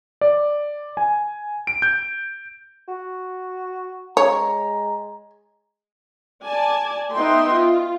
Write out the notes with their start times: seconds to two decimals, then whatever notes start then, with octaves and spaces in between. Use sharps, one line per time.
0.21 D5
0.97 G#5
1.67 D7
1.82 G6
2.88 F#4
4.17 G#3 C#5 A#5
6.42 D5 G#5 A5
7.14 B3 D#4 D#5 E5 G5 C6
7.52 F4